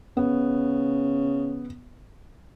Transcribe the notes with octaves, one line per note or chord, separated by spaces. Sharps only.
C#3 B3